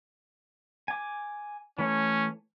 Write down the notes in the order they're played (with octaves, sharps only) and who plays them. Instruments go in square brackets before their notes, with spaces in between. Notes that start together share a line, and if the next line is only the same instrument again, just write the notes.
[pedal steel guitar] G#5 D6
[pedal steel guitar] E3 A3 C#5 [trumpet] C#4